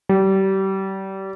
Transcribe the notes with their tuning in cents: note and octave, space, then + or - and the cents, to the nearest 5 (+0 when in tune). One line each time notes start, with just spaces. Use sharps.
G3 -30